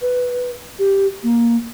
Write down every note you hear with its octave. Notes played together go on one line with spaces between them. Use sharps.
B4
G4
A#3